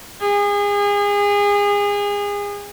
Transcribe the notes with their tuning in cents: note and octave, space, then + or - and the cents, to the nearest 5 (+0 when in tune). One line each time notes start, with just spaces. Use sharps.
G#4 -30